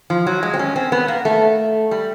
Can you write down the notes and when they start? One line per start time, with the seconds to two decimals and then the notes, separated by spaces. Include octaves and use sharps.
0.10 F3
0.27 F#3
0.43 G#3
0.54 C4
0.59 C#4
0.76 C4
0.92 B3
1.08 A#3
1.25 A3
1.91 G3